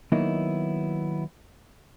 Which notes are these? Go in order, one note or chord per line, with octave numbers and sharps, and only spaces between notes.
D#3 F#3 A#3 B3 D#4 E4